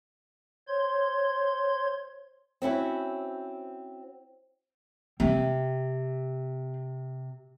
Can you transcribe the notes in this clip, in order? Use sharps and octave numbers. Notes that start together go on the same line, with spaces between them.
C5 C#5 C6 G#6
C4 C#4 E4 F#4
C3 C4